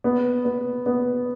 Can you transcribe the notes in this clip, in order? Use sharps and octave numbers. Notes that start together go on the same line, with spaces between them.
B3
B3
B3